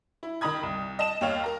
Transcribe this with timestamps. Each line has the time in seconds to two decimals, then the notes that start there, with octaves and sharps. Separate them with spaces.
0.23 E4
0.41 D#3 A#5 B5 D#6 G#6
0.63 C2
0.99 D#5 A5 E7
1.21 D#2 C#5 F5 F7
1.44 A#4 A#5